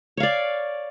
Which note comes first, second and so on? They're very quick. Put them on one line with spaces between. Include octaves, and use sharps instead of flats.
C#5 F5 D5